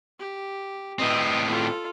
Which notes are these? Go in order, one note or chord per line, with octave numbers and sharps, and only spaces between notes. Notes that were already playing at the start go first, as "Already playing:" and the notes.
G4
A2 C4 B4 D#5
F4 A4